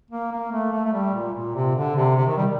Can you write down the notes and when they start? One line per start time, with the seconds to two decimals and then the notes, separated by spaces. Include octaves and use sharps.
0.11 A#3
0.32 A#3
0.52 A3
0.73 A3
0.85 A3
0.93 G3
1.14 A#2
1.34 A#2
1.55 C3
1.76 D3
1.96 C3
2.16 C3
2.27 D#3
2.37 G3